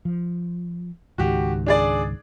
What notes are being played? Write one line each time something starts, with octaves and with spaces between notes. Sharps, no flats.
F3
C#2 G#2 D#3 F#4 G4
D4 G#4 D5